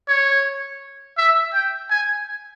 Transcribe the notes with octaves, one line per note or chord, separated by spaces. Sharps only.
C#5
E5
G5
G#5